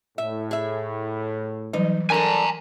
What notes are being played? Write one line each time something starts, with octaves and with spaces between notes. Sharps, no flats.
A2 E5
G#4 E5
E3 F#3 G3 D#4
D4 A4 A#4 G#5 A#5